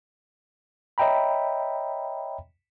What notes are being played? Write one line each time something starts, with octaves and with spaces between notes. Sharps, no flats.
C#5 D#5 E5 G5 A#5 B5